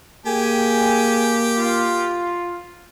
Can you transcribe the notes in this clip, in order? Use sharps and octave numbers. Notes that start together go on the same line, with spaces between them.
A#3 G4 G#4 G5 G#5
F4